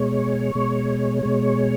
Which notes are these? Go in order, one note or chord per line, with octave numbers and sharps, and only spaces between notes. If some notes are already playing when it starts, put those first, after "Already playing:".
Already playing: B2 G#3 C#5
B2 G#3
B2 G#3